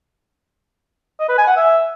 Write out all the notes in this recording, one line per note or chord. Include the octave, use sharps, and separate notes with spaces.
D#5
B4
G#5
F#5
E5